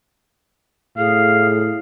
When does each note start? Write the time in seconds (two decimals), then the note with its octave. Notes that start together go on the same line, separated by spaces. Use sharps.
0.97 A2 G#4 F5